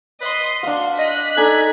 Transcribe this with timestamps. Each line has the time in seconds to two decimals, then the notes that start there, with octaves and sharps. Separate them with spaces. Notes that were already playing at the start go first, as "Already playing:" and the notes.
0.21 B4 D#5 C6
0.63 D4 F#4 F5 C6
0.99 D#5 F#6 B6
1.37 D4 D#4 A4 G#5